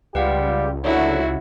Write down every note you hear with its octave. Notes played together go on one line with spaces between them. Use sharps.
C#2 G3 F4 G4 B4 F5 F#5
D2 D3 F#3 E4 F#4 C#5 E5 F#5